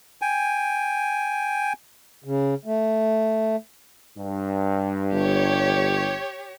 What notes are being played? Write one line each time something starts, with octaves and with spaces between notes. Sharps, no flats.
G5 G#5
C#3
A3
G2
G1 G4 C#5